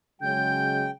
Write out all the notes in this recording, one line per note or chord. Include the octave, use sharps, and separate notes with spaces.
C#3 F#3 G#3 G5 G6